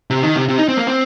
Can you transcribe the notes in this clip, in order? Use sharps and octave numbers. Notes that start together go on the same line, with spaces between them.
C3
D#3
C3
C3
D#4
C4
A#3
C4